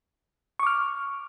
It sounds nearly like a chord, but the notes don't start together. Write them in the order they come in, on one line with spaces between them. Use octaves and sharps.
C#6 D6 F6